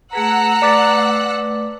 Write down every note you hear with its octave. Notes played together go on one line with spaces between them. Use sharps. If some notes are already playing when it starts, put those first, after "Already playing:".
A3 G#4 B4 F#5 A#5 E6 F#6
A3 B4 D5 D6 A6